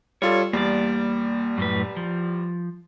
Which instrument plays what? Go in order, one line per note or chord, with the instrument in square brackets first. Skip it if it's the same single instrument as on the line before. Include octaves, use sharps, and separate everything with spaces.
[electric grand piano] G3 F4 A4 [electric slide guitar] C#5
[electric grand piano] E2 G3 [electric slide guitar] A#3 D5
[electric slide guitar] F#2 A2 B4
F3